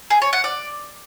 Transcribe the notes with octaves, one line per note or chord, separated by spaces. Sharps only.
G#4
C#5
F#5
D5